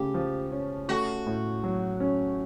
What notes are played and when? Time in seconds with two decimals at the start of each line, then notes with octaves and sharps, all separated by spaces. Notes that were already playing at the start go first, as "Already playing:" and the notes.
Already playing: C#3 A3 G4
0.14 F3
0.51 C#4
0.89 A3 F#4
1.27 A2
1.64 F#3
2.00 C#4